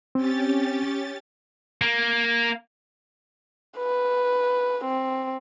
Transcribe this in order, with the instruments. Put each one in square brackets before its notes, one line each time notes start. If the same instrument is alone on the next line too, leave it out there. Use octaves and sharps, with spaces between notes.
[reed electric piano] C4 [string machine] C#4 G4 A6
[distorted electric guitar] A#3
[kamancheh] B4
C4